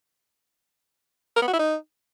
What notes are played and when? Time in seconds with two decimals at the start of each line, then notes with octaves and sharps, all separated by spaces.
1.36 A#4
1.42 B3
1.48 F#4
1.53 E4
1.59 D#4